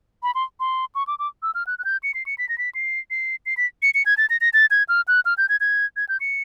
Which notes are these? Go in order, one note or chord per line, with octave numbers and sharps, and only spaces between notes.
B5
C6
C6
C#6
D6
D6
E6
F6
F#6
F#6
G6
C#7
C7
C#7
B6
A#6
B6
C7
C7
C7
B6
C#7
C#7
G#6
A6
A#6
A#6
A6
G#6
F6
F#6
F6
G6
G#6
G#6
G#6
G6
C#7